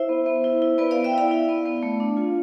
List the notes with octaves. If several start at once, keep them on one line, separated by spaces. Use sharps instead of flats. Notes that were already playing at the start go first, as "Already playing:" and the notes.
Already playing: E4 C5 E5
B3
B3
E4
E4
B3 B4 D5
B3 D5 F5
E5 G5
E4 D5 F5
E4
B3
B3
A3
D4
F4